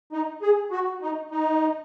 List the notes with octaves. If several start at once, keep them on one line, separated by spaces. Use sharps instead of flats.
D#4
G#4
F#4
D#4
D#4